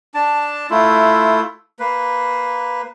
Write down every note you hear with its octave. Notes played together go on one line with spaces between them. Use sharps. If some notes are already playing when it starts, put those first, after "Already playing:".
D4 A5
A3 E4 F4
A#3 B4